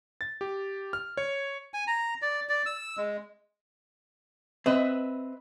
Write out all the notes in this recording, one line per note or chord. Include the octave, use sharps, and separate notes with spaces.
A6
G4
F6
C#5
G#5
A#5
D5
D5
E6
G#3
C4 B4 D#5 E5